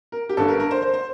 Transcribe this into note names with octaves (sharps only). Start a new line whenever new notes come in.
A#4
G4
G1 G2 D3 A4
A#4
A#4
C5
C5
C5